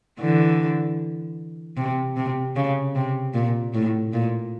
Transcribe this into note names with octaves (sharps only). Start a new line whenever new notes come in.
D3 E3
C3
C3
C#3
C3
A#2
A2
A#2